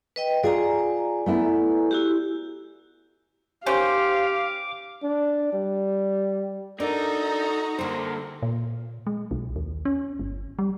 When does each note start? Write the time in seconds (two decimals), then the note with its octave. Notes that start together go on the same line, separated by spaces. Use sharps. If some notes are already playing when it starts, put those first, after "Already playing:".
0.16 B4 D#5 G5
0.43 F4 G#4 D5 G#5 A#5
1.26 A3 B3 E4
1.91 E4 F#4 G4
3.66 D#3 C#4 G4 C5 F5 D6
5.03 D4
5.53 G3
6.80 D4 D#4 F#4 A4 A#4 D5 A#5
7.79 D3 G3 A#3 C5
8.42 A#2
9.07 G#3
9.31 B1
9.56 D#2
9.85 C#4
10.19 G1
10.59 G3